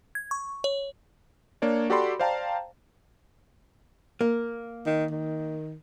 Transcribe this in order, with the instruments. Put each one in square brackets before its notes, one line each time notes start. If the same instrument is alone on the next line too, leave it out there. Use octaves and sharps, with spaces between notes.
[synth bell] G#6
C#6
C#5
[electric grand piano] A#3 D4 C#5 D5
F#4 G4 A4 D5 B5 C6
C5 D5 F5 G5 A5 A#5
[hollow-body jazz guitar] A#3
[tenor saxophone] D#3
D#3